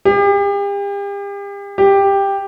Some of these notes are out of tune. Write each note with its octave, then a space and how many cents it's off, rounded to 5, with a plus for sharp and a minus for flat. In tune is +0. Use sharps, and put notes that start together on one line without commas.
G4 +40
G4 +10